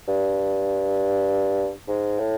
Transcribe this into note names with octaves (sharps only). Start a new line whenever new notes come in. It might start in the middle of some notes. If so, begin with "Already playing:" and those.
G2
G#2
A2